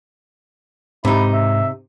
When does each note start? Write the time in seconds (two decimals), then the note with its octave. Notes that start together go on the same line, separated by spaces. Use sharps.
1.05 G#2 C3 D#4 E4
1.33 E5